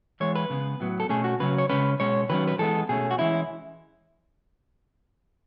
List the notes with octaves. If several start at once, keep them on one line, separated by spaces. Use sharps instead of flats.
E3 G#3 B3 C#5
B4
C#3 G#3 B3
A2 F#3 B3
A4
B2 A3 C#4 G#4
F#4
C#3 F#3 C#4 B4
C#5
C#3 G#3 C#4 B4
B2 G#3 C#4 C#5
D#3 F#3 C#4 B4
B4
E3 G#3 B3 A4
B2 A3 C#4 G#4
F#4
E3 G#3 C#4 E4